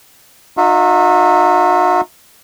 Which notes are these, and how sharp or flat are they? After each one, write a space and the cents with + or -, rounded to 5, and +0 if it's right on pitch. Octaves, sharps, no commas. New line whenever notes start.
D#4 -25 F#4 -40 E5 +0